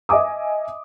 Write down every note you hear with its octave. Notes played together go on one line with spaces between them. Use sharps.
D#5 E5 G#5 D6 D#6